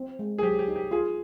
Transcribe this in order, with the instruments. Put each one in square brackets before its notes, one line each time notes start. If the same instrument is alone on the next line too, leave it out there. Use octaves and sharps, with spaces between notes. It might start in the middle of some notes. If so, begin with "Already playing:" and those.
Already playing: [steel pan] C4
G#3
[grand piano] G#4
[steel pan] F#3 [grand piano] G4
[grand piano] G4
[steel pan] D#4
[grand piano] G4
[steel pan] F4 [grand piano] G#4